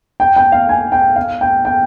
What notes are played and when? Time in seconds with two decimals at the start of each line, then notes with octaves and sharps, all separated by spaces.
0.20 G5
0.36 G5
0.52 F5
0.69 G#5
0.92 G5
1.16 F5
1.41 G5
1.65 G5